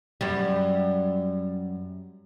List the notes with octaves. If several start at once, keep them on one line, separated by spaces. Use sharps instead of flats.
F#2 G3